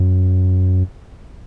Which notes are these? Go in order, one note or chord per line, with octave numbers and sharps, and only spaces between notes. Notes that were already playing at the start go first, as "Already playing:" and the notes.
Already playing: F#2